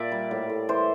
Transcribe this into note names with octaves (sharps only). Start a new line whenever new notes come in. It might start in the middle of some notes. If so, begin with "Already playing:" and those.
Already playing: A#2 D5 E5
G3
A2
A2
E3 C5